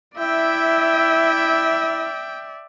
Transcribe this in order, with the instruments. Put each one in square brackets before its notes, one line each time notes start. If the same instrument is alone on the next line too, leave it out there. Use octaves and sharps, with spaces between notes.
[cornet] E4 [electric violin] D5 E5 [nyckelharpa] G5